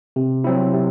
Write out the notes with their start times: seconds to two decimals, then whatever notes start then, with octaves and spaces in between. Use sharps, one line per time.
0.16 C3
0.44 F#3 C4 E4
0.74 C3